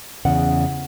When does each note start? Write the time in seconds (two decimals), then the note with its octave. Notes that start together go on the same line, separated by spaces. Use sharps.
0.25 E2 C#3 F#5